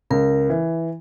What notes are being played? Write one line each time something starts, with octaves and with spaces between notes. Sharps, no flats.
C#2 A#4
E3